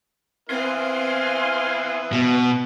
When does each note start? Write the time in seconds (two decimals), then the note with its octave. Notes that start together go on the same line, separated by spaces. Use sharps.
0.49 B3 C4 E4 B4 F5 G#5 C6
2.12 B2